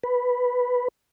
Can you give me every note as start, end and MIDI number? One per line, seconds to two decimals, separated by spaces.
0.03 0.88 71